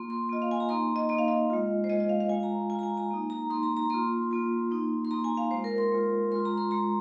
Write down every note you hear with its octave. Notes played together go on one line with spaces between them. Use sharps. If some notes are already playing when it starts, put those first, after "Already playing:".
Already playing: A#3 F4 C6
C6
A#3 F4 D#5
F5
G#5
A#5
A#3 D#4 C6
D#5
A#3 D#4 D#5
F5
D#5
G#3 F4
C5
G#3 F4 D#5
D#5
F5
F5
G#3 F4 G#5
A#5
G#3 F4 G#5
A#5
G#5
A#5
A#3 D#4
A#5
A#3 D#4 C6
A#5
A#5
A#3 F4 C6
A#3 F4
A#3 D#4
C6
A#3 D#4 A#5
G#5
F5
G#3 F4 C5
A#4
C6
G#3 F4
G#3 F4 C6
A#5
C6
G#3 F4 A#5